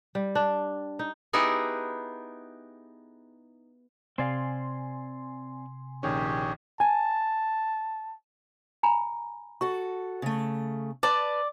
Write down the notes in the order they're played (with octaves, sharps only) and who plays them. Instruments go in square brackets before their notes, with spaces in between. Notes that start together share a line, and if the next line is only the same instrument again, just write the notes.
[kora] G3
D4
D#4
[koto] B3 D#4 E4 G4 G#4
[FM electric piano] C3 G#5 C6 [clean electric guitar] C4 D5 F5
[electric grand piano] A#1 D#3 C#4 [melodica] G4 G#4 C#5
[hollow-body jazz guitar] G#5 [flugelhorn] A5
[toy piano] G#5 A#5 B5
[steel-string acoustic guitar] F#4 A4 [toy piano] C#6
[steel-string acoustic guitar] C#3 A3
[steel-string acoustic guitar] B4 A5 [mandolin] D5